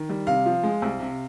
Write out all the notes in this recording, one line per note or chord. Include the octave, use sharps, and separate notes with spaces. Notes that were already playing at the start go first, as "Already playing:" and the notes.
Already playing: D#3
G3
C3 F5
F3
G#3
C2
C3